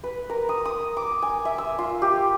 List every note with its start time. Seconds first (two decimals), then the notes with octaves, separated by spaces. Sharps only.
0.04 B4
0.30 A#4
0.49 D#6
0.65 D#6
0.97 D6
1.22 G#5
1.45 E5
1.58 E6
1.79 F4
2.02 G4